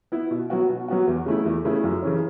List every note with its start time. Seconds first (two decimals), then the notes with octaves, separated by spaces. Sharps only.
0.12 B3 E4
0.31 B2
0.50 F#3 B3 F#4
0.69 B2
0.88 F#3 B3 F#4
1.07 E2
1.26 C#3 A3 E4
1.45 E2
1.65 C#3 A3 E4
1.84 F#2
2.02 C#3 E3 C#4